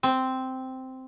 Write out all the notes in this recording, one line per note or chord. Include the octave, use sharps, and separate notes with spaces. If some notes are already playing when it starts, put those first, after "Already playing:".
C4